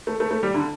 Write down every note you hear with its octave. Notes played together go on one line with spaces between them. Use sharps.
A3
A3
A3
G3
D3